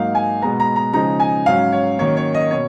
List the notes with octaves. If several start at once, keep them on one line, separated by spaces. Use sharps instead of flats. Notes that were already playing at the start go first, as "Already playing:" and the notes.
Already playing: G#2 F#3 A#3 D#4 F5
G#5
B2 G#3 B3 A#5
A#5
A#5
C#3 F3 G#3 D#4 A#5
G#5
G#2 F#3 C#4 F5
C#5
D#3 F#3 A#3 C#4 C#5
C#5
D#5
B2 C#5